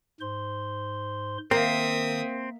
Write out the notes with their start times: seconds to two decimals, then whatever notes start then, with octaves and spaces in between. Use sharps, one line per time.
0.21 G#2 C5 C6
1.51 D#3 A#3 C4 E5 D#6